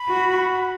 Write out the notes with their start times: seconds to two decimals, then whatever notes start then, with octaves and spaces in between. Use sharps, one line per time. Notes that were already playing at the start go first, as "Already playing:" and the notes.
Already playing: B5
0.08 F#4